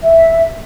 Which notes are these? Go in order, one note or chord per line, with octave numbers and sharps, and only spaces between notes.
E5